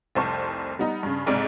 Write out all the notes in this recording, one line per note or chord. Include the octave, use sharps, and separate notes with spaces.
F1 C2 C5 A5 C#6
G3 B3 D#4
G2 C#3
B1 G#2 C3 D5